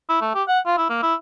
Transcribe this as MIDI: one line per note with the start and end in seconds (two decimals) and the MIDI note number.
0.09 0.19 64
0.21 0.34 57
0.35 0.43 67
0.48 0.59 78
0.66 0.77 65
0.78 0.85 64
0.89 0.99 58
1.02 1.14 64